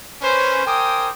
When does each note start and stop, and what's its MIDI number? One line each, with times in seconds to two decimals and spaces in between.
0.22 0.63 61
0.22 0.63 71
0.22 0.63 72
0.66 1.10 70
0.66 1.10 72
0.66 1.10 79
0.66 1.10 80
0.66 1.10 86
0.66 1.10 87